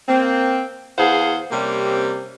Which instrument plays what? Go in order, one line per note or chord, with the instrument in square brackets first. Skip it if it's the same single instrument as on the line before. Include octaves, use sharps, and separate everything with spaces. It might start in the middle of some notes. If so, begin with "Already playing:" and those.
[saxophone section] A#3 C4
E2 G#4 C5 F5 F#5
C3 G3 A#3 C4 C#4